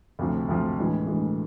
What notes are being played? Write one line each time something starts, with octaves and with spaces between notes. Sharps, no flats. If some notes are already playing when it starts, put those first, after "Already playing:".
D2 C3 F3
D2 C3 F3
A2 E3 G#3 D4
A2 E3 G#3 D4